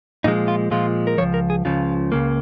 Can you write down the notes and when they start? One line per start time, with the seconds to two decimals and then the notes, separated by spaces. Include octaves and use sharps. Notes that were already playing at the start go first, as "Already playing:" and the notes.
0.24 A#2 F3 G#3 D#4
0.48 F4
0.71 A#2 F3 G#3 F4
1.07 A#4
1.18 C#2 C#3 F3 C#5
1.34 A#4
1.50 G#4
1.65 C#2 C#3 F3 F4
2.12 C#2 C#3 A#3